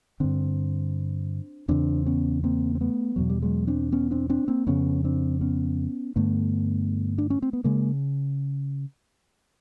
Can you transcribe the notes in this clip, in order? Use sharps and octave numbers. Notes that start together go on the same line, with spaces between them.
G2 D3 C4 D4
E2 C#3 C4 D4
B3 C#4
A#3 C4
C4
A3 B3
E2 B2 F#3
G3
F#3 G#3
C4 D4
B3 C#4
C4 D4
C4 D4
A#3 C4
F2 C#3 B3 C#4
C4 D4
B3 C#4
G2 D3 A3 B3
D4
C#4
C4
B3
C#3 G#3 A#3